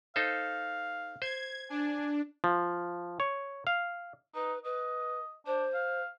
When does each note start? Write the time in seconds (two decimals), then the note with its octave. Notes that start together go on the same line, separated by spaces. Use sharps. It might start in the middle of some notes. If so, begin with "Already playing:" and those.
0.16 D#4 A4 C5 F5
1.22 C5 G#6
1.70 D4 G#5
2.44 F3
3.20 C#5
3.67 F5
4.35 D#4 B4
4.64 B4 D#5
5.47 D4 C5
5.74 F5